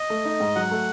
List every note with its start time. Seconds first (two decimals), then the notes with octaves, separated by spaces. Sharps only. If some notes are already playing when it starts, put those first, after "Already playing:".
Already playing: D#5
0.10 A3
0.25 D#4
0.40 G#2
0.56 F#3 F#5
0.71 A3